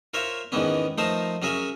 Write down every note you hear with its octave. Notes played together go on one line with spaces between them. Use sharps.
F4 A#4 C5 C#5 E5
E2 G#2 D#3 E3 B3 C#4
F3 A3 D#4 A#4 C5 A5
F#3 C#4 G#4 A#4 E5